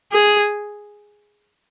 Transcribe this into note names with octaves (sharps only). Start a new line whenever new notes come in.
G#4